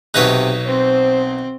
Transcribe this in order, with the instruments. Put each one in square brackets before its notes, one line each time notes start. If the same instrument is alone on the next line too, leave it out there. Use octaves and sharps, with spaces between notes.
[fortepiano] B1 F#6 [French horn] C3 [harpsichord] D#4 B4 C#5
[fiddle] C4 [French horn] C5